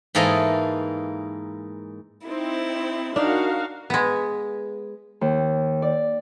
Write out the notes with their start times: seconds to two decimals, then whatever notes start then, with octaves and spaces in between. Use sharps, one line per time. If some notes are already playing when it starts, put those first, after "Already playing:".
0.15 G#2 E3 A#3 A4 D#5 G#5
2.27 C4 D#4 E4
3.16 D4 D#4 F#4 A#4 F5
3.90 G#3 B3
5.21 D#2
5.82 D5